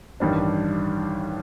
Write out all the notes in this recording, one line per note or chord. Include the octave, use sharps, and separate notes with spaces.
A1 G2 D#3 G3 D4